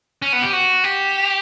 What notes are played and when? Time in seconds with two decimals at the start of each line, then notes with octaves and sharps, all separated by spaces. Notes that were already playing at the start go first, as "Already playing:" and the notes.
0.22 C#4
0.33 B3
0.42 G4
0.53 F#4
0.84 G4